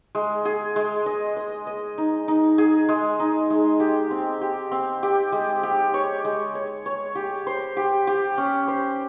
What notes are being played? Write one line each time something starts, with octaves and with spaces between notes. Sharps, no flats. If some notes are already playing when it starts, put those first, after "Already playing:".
G#3
G#4
G#3
D#5
D#5
D#5
D#4
D#4
G#4
G#3
D#4
G#3
G4
C4
G4
C4
G4
G#3
G4
C#5
G#3
C#5
C#5
G4
C5
G4
G4
C#4
C5